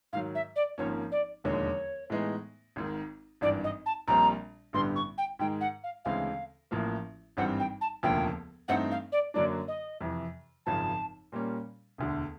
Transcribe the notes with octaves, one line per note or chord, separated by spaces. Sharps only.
G#2 D#3 F#3 F5
E5
D5
G#1 G#2 F3 A#3 C#4 C#5
D5
E1 D#2 D3 F3 G#3 C#5
A2 E3 G#3 B3 D#4
G#1 G#2 D#3
G#1 G2 E3 D5
D#5
A5
A#1 A#2 G3 C4 A#5
A1 G2 D3 G3 B3 C6
C#6
G5
G#2 D#3 G#3 G5
F#5
F5
D2 C#3 E3 G#3 C4 F5
A1 A2 F3 A#3
G#1 G2 E3 G3 C4 F#5
G5
A5
E1 D2 C#3 F3 A#3 G5
G2 E3 A3 C4 D#4 F#5
F5
D5
F#2 D3 F#3 A#3 D4 D5
D#5
F2 C3 E3
G#1 F#2 C#3 F3 A5
A#2 G3 A#3 C#4
E1 D2 D3